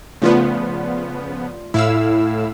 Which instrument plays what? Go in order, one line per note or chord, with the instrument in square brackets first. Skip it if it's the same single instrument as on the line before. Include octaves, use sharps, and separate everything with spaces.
[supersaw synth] C#3 F3 B3 [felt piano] A3 F4 D5
[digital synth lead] A2 [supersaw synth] E4 F5 E6